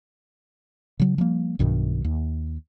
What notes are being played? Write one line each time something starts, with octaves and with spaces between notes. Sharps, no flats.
C#3 F#3
F3 G3 A#3
B1 G2 B2 D#3
D#2